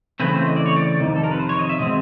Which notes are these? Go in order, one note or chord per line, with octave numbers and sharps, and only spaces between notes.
C#3 E3 A3 C4 E4 B4
C5
D#5
D5
C#5
D5
F2 C3 D#3
A4
A#4
B4
C5
C#5
D#5
E5
B2 G#3 C4 D#5